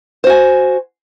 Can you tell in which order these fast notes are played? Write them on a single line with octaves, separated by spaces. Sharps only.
C5 F#4 G#5